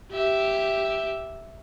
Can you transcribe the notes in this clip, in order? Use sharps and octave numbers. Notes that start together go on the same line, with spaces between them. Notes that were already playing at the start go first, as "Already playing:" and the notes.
G4 E5